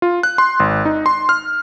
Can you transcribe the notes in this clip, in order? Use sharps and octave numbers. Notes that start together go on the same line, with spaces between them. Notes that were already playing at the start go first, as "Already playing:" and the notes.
F4
F#6
C6
G#1
D#4
C6
F6